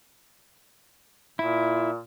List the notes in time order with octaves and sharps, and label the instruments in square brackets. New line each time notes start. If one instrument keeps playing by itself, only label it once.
[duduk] A#2 [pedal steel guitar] E4